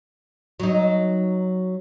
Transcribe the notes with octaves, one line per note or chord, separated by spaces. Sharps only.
F#3 D#4